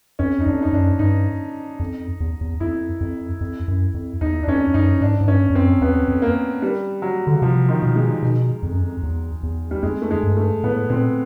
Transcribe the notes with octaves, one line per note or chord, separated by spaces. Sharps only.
F2 C#4
D#4
F2 D4
D#4
F#2 D4
G2 D#4
F2
E2
E2
F2 E4
F2
F2
F#2
F2
E2 D#4
D4
F2 C#4
F#2 D#4
G#2 D4
G#2
G2 C#4
F2
F#2 C4
E2 B3
F2
A#3
G3
F#3
D3
C#3
C3 F3
D#3
B2
G#3
B2
F2
F#2
F2
E2
E2
G3
F2 G#3
A3
G#3
G2
A3
A2 B3
A#2 C4